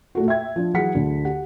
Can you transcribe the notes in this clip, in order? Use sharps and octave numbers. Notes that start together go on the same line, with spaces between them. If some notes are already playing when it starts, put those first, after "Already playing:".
A#2 A3 F#4
E5 G5 G#6
F3 D4
E3 F#3 G#4 F#5 B6 C#7
D2 D3
G4 F#5